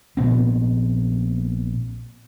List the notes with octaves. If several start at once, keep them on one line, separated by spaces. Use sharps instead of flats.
A#1 A#2 B3 C4